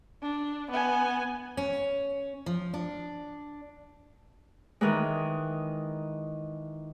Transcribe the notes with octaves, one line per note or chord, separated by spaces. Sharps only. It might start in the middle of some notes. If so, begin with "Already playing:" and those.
D4
B3 G#5
C#4
F3
D4
D#3 E3 G#3